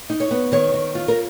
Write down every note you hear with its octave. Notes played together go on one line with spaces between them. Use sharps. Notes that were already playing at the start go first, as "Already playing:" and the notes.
D#4
C#5
B3
D#3 C#5
D#3
F4
A#4